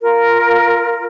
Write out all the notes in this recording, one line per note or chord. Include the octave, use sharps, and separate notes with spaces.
F4 A#4